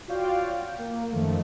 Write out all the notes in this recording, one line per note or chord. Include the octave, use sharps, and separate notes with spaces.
F4 F#4 C#5 D5 F5 G5
G5
A#3
F#2 D#3 F3 A3